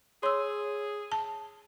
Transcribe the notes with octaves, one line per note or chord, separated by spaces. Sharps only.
G#4 C#5 C6 E6
A5